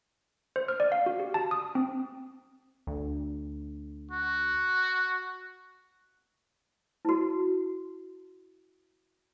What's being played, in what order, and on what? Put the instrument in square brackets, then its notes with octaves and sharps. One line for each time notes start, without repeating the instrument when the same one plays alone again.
[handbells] C5
F6
D5
F5
F#4
G4
A5
D#6
C4
[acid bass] D2
[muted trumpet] F#4
[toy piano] E4 F#4